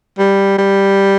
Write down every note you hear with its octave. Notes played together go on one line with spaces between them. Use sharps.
G3
G3